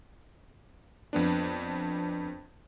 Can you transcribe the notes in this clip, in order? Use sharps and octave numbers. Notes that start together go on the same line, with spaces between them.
F2 B3 D4